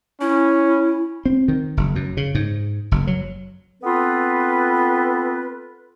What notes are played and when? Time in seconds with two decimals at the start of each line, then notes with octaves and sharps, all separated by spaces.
0.21 C#4 E4
1.26 C4
1.48 D#3
1.77 F#1
1.95 F#2
2.17 C#3
2.35 G#2
2.91 F#1
3.07 F#3
3.83 B3 C4 F4 A4 B4